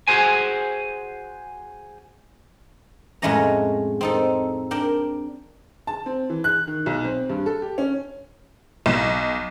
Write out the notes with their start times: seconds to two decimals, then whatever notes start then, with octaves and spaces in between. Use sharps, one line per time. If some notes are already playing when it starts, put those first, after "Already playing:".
0.07 F#4 G#4 C5 G#5
3.22 F2 A2 G#3 A3 C#4 A#5
4.01 C4 D#4 A4
4.71 D4 A#4 G5
5.87 A5
6.06 C4
6.30 E3
6.44 F#6
6.67 D#3
6.86 B1
7.05 C4
7.29 G2
7.46 A4
7.62 G4
7.78 C#4
8.86 B1